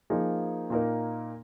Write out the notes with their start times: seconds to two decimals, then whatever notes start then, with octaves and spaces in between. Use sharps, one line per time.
0.10 F3 A#3 D#4 G#4
0.70 A#2 A#3 D#4 A#4